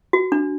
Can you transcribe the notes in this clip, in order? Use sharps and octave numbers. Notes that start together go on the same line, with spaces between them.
F#4
D4